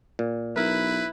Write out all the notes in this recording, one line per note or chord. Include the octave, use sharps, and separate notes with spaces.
A#2
B1 E4 A#4 B4